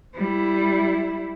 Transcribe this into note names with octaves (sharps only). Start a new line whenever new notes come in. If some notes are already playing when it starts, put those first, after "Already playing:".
G3 E4